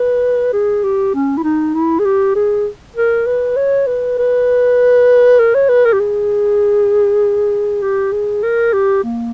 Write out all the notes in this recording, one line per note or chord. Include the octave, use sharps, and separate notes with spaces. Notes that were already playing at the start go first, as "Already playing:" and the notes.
Already playing: B4
G#4
G4
C#4
E4
D#4
E4
G#4
G4
G#4
A#4
B4
C#5
B4
B4
A#4
C#5
B4
A#4
G4
G#4
G4
G#4
A#4
G4
A#3